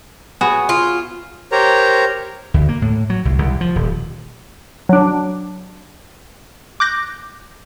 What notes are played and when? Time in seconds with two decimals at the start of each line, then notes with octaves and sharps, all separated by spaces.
0.41 B3 F#4 G#4 C#5
0.69 F4
1.52 G4 A#4 C5 C#5 A#5
2.54 D2
2.69 A#3
2.82 A2
3.10 F#3
3.25 C2
3.38 C2
3.61 F3
3.76 D#1
4.89 F#3 D4
6.80 D6 F#6 G6 A#6